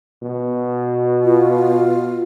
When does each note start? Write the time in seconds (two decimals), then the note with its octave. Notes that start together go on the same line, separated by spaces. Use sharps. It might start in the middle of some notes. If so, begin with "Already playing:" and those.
0.23 B2
1.24 F4